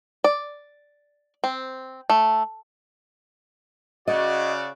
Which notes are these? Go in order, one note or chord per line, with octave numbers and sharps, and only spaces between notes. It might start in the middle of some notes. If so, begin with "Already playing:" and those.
D5
C4
A3
C#3 F#4 D5 D#5